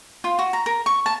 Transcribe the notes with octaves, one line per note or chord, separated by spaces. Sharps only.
F4
F#4
A#5
A#4
C#6
A5